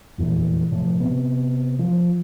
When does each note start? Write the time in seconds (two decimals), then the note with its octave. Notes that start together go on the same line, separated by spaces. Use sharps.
0.18 F1 E2 G2 A#2
0.71 G#1 A2 C3 F3
0.99 C3 B3
1.79 F3